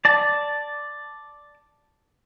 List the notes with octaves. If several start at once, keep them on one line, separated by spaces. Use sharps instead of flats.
D5 A5